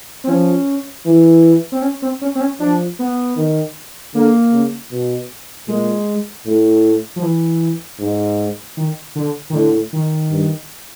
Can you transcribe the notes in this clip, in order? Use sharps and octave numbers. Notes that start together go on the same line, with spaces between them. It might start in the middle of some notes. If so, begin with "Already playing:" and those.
C4
F3 C#4
E3
C4
C#4
C4
C#4
C4
C#4
F3 D4
B3
D#3
D3 A#3
C#3
B2
A#2 G#3
A2
F3
E3
G#2
D#3
D3
D#3
A2 D3
D#3
G2